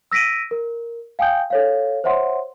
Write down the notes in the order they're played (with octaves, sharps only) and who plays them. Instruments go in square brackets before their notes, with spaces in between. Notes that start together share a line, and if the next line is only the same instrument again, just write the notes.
[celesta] E6 A#6 B6 D7 D#7
A#4
F5 G5 G#5 D#6 G6
A4 C#5 F5
C5 C#5 E5 F#5 C6